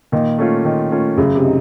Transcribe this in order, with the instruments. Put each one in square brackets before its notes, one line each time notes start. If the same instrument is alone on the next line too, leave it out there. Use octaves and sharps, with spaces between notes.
[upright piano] A#2 [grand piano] D#3
[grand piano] A3 C#4 F4
D#3
A3 C#4 F4
[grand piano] F#2 [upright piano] C#3
[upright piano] C3
[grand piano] D#4